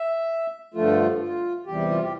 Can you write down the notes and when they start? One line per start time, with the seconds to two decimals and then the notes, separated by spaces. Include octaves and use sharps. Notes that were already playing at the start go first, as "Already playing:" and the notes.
Already playing: E5
0.74 G2 D3 F3 A3 F4
1.20 F4
1.66 E2 C3 G3 G4
1.91 F4
2.02 G4